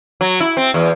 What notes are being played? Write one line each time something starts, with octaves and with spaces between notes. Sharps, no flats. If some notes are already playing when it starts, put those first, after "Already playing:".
F#3
E4
C4
E2